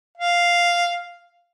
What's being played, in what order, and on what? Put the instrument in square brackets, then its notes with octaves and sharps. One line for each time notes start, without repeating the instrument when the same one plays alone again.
[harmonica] F5